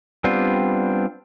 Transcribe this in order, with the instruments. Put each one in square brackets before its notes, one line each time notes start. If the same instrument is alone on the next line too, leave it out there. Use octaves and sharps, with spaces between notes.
[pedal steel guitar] G3 B3 C4 D4 F4